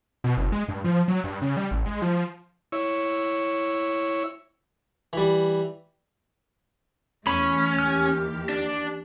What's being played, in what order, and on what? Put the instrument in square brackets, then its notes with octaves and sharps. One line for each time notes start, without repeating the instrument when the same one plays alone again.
[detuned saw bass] B2
F#1
G#3
G2
F3
F#3
G2
C#3
G3
A1
G#3
F3
[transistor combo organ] E4 C#5
[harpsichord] E3 G3
[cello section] E2 A3 [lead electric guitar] C#4 [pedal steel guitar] B5 C#6
[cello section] D#2 E3 G4 [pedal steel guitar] F6
[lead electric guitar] D4